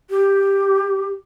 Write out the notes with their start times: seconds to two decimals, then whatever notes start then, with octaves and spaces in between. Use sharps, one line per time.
0.10 G4